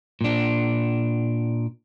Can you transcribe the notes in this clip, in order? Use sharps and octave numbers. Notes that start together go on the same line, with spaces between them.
A#2 D4